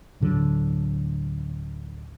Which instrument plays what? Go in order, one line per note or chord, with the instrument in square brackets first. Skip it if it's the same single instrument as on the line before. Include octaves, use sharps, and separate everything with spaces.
[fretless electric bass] D2 A2 D3 F#3